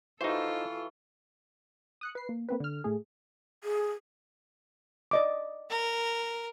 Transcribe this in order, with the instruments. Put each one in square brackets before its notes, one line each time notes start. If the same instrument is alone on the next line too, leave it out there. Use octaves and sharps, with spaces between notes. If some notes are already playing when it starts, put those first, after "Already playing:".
[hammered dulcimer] E3 F#4 [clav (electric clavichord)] D#4 C5 [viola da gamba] F4 A4
[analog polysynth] D#6 F#6 C#7
B4 C7
A#3
A#3 C4 B4
D3 F6
A2 A3 G#4
[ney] G#4
[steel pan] D5 D#5 D6
[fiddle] A#4